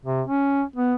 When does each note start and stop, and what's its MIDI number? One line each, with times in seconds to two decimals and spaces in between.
0.05 0.22 48
0.27 0.62 61
0.76 0.94 59